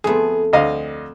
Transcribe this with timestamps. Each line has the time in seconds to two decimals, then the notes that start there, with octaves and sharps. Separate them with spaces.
0.04 F2 A3 B3 G#4
0.53 D2 D#5 F5